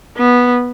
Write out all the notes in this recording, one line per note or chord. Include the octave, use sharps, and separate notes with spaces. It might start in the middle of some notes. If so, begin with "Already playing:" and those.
B3